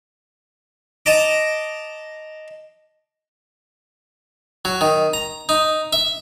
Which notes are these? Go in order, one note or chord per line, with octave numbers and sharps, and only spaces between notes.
D#5 A5 A#5 D6
F#3
D#3
A#5
D#4
E5